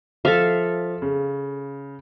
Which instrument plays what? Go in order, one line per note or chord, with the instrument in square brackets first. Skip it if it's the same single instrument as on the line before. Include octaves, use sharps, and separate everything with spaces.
[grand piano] F3 [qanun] A4 E5 F5
[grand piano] C#3